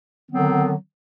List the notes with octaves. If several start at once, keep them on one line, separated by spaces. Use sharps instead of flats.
D3 D#3 F#3 B3 C4